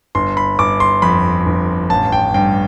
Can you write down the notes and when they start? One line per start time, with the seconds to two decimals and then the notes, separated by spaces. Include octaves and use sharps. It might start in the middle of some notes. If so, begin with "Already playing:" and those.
0.15 G1 C6
0.37 B5
0.59 G1 D6
0.80 C6
1.02 F2 B5
1.46 G1
1.90 A1 A5
2.12 G5
2.34 G2 G5